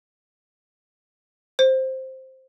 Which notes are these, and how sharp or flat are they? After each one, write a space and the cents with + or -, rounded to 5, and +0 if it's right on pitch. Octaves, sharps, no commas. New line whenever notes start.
C5 +5